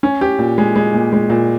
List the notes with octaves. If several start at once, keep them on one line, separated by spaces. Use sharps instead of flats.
C#4
G4
A#2
G#3
G#3
A#2
G#3
A#2